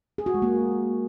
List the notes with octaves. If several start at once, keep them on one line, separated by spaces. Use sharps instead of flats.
G#4
F#4
G#3
A#3